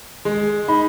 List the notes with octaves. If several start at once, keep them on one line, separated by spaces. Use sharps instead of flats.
G#3
D#4 B5